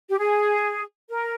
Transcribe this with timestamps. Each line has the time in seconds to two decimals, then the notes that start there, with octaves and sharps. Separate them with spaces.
0.10 G4
0.18 G#4
1.09 A#4